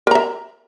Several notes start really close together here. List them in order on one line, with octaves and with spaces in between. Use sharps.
A#4 A#5 E5